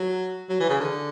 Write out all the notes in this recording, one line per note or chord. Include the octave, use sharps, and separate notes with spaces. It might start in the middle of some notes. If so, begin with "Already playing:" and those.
Already playing: F#3
F#3
E3
C#3
D3